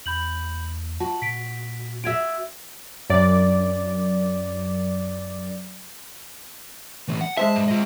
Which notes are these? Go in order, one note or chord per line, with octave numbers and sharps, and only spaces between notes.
E2 B5 G6 F#7
F4 F#4 A5
A#2 B6 D7
F4 F#4 E5 E6 G#6 D7
F#2 D5
E3 A3
F#5
G#3 C5 E5 A5
G2
F4 D#5